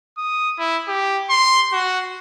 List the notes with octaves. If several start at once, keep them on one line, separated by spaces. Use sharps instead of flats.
D#6
E4
G4
C6
F#4